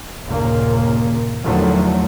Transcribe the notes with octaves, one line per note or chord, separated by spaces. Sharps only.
G1 D#2 A#2 C#3 A#3
E2 D3 D#3 F3 F#3 A3